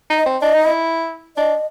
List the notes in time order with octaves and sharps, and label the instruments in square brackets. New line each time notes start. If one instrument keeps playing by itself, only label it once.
[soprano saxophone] D#4
[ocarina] D#5
[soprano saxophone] C4
[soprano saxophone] D4 [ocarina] D#5
[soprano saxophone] D#4
E4
[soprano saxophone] D4 [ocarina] D#5